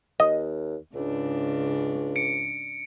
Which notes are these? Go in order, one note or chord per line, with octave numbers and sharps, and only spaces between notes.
D#2 D#5
C#2 G#2 C#3 D4
C#7 D7